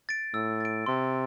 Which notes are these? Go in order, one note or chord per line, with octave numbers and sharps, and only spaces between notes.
A6 D7
A2 E6
A6 D7
C3 C6